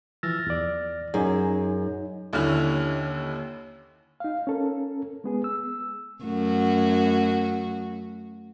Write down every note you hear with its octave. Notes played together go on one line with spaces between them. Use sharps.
E3 F3 E6 F6 A6 A#6
E2 D5
F#2 D#4 G#4 G#5
D#2 D3 C#4 E4 F6
D#4 F5
C#4 A4 A#4
G#3 B3 G#4
E6
F#2 A3 F#4